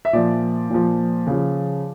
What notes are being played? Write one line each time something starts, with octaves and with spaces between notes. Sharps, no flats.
E5
A#2 F3 D5
A#2 F3
C#3 F3